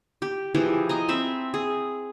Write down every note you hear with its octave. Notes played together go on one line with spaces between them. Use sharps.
G4
E3 F3 G4 G#4
D#5 G#5 A#5
C4 E5 B5
G#4